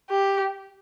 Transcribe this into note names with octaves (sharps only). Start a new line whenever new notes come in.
G4